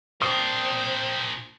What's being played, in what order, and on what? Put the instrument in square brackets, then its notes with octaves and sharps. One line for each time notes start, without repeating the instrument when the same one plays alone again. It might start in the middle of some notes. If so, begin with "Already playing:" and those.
[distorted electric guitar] A#2 D4 [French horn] C4 [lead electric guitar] C5 [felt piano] D#6